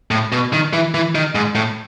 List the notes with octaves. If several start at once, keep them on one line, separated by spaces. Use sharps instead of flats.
A2
B2
D#3
E3
E3
D#3
G#2
A2